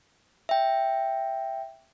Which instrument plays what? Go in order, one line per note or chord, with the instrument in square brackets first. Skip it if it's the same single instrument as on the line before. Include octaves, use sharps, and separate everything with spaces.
[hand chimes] E5 G5